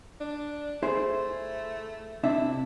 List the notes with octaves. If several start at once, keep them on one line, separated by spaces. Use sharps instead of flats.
D4
A3 E4 G#4 C5
C3 D4 E4 E5